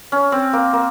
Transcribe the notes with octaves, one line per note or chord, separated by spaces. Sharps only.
C#4
C4
A#3
A#3